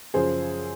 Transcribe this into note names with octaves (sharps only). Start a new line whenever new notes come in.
F#2 C#3 F3 G#4 C5